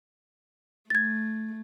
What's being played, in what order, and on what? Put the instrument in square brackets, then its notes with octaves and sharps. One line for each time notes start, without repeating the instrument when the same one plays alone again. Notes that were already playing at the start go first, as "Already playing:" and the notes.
[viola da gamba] A3 [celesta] G#6 A6